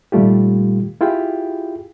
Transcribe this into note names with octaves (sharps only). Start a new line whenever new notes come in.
A#2 D#3 G3 A3 F4 G4
E4 F4 G4 G#4 G5